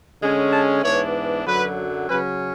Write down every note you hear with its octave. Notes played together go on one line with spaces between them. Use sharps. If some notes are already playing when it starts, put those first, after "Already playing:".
D3 G#3 C#4
A5
G#2 E3 B3 D4 C#5
F#2 D3 F#3 B4
C#3 F#3 C#4 B4